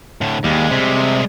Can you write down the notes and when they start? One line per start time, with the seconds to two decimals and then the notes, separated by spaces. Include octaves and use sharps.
0.21 A2 D3
0.44 D#2 G3 G#3
0.71 C3